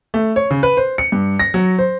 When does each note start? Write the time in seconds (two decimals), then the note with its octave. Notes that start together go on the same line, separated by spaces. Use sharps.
0.14 A3
0.36 C#5
0.51 C#3
0.63 B4
0.77 C5
0.98 C#7
1.12 G2
1.40 A#6
1.54 F#3
1.79 C5